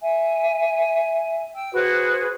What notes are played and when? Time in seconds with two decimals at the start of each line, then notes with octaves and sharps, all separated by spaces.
0.02 E5 G#5
1.53 G5 E6
1.73 F#4 G#4 B4 C5